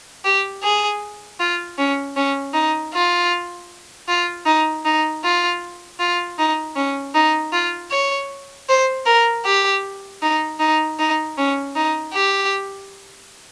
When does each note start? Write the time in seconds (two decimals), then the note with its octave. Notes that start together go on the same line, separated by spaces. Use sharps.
0.25 G4
0.63 G#4
1.40 F4
1.78 C#4
2.16 C#4
2.54 D#4
2.93 F4
4.08 F4
4.45 D#4
4.85 D#4
5.23 F4
5.99 F4
6.38 D#4
6.76 C#4
7.15 D#4
7.52 F4
7.91 C#5
8.69 C5
9.06 A#4
9.45 G4
10.22 D#4
10.60 D#4
10.99 D#4
11.37 C#4
11.76 D#4
12.13 G4